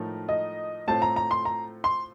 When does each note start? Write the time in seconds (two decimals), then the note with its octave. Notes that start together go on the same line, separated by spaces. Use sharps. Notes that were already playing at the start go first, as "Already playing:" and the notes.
Already playing: A2 F3 A3 D#4 A#4
0.29 D#5
0.87 A2 A3 C4 F4 C5 A5
1.02 A#5
1.16 A#5
1.31 C6
1.45 A#5
1.84 C6